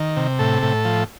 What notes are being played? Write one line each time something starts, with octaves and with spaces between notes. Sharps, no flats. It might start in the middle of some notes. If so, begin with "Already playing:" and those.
Already playing: D#3
C3
A2 A4
A2
F3